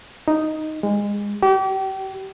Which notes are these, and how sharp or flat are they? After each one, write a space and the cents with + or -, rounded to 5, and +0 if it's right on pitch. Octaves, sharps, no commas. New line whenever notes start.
D#4 +0
G#3 -25
G4 -35